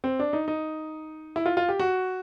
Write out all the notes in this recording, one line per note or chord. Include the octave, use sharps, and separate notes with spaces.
C4
D4
D#4
D#4
E4
F4
F4
G4
F#4